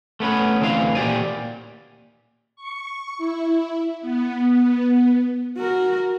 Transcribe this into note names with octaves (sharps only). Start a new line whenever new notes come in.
A3 B3 C#4 B4
D2 E3 C4 C5 F5
A#2 G4 D5 G#5
C#6
E4
B3
F#4 A#4